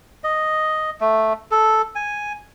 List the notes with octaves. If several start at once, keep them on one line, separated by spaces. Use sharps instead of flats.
D#5
A3
A4
G#5